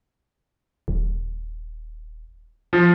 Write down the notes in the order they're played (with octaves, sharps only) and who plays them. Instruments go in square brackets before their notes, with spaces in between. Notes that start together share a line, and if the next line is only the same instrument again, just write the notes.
[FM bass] D#1
[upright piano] F3